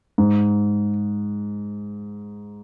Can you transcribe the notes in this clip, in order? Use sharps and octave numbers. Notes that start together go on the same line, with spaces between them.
G#2